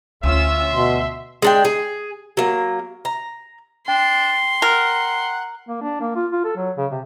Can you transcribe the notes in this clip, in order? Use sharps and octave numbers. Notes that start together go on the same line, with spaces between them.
D2 C#4 F4 E5 E6
B2 C6
G#3 D4 G5
G#4
F#3 A#3
A#5
D4 G5 C6
A#4 F#5
A#3
D4
A#3
F4
F4
A4
F#3
C#3
C3